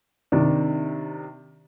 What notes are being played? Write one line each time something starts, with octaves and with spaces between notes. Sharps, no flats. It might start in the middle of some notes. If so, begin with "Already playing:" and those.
C3 D#3 D4